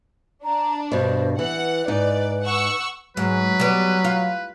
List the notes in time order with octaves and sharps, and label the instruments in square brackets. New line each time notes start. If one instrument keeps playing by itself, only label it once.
[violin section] D4 [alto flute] A#5
[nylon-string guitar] G2 B2 [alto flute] C5
[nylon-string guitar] E3 [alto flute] B4 [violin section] F#5
[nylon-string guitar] G#2 D#4 [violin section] D5
[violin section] F#5 C#6 E6
[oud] G#2 [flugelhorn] F#3 [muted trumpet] B4
[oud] G3 B3
F4